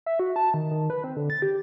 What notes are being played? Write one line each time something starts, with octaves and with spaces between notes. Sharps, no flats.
E5
F#4
A5
D#3
D#3
B4
C4
D3
A6
G4